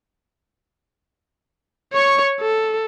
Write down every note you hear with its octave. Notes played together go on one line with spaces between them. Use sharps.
C#5 C#6
A4